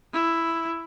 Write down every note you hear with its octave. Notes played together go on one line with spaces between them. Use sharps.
E4